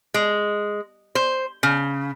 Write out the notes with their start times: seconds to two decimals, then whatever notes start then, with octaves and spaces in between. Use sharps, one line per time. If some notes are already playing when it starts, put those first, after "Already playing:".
0.14 G#3
1.15 C5
1.63 C#3